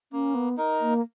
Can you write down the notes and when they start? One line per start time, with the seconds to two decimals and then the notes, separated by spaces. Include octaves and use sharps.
0.12 A#3 C#4
0.35 B3
0.57 D#4 A#4
0.80 A#3